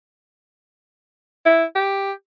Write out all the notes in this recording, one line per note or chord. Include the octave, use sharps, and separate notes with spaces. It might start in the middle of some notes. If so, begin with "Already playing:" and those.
E4
G4